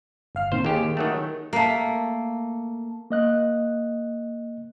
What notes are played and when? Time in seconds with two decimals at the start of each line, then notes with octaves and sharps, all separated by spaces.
0.35 G1 F5 F6
0.52 A#2 D#3 C4 C5
0.65 D#2 A#3 G4 G#4
0.97 D#3 F#3 A3
1.53 A3 A#3
3.10 A#3 D#5 F#6